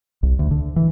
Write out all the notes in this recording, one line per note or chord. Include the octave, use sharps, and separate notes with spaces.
C2
D2
D3
E3